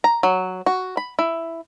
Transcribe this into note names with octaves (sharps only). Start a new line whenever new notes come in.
A#5
F#3
F#4
B5
E4